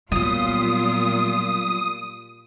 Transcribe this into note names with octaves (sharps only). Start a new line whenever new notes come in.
A#2 F#3 G3 B3 F4 D#6